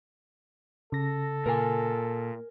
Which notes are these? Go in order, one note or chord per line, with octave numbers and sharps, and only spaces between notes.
C#3 A4 A#6
A#2 A#4 G#5